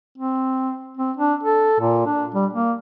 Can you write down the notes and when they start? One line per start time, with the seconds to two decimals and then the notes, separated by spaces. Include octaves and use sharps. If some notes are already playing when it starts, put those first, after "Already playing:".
0.18 C4
0.97 C4
1.17 D4
1.43 A4
1.80 A#2
2.06 D4
2.35 G3
2.53 A#3